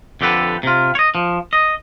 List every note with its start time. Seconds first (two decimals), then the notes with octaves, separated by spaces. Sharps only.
0.21 F2 D3 G4 A4 B4
0.63 C3 F4
0.95 C#5 D#5
1.15 F3
1.53 D#5